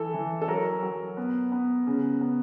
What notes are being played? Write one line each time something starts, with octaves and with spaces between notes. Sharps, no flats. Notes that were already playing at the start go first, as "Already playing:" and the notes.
Already playing: E3 A4
E3
A4
F#3 A#4
F#3
B3
B3
C#3
B3